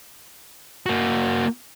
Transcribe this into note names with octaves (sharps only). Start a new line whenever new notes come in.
A#3 F#4